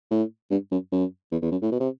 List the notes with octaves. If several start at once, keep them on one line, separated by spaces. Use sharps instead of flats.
A2
G2
F#2
F#2
E2
E2
F#2
A2
B2
C3